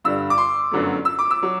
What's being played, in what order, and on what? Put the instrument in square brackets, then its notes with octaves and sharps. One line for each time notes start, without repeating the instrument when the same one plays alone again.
[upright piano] G2 D3 G3 E6
D6
C6
G1 F#2 D3 F#3 A3
E6
D6
E6
F#3